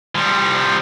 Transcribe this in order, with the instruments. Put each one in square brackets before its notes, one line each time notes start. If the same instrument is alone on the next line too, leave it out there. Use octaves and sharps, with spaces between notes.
[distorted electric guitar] F3 G3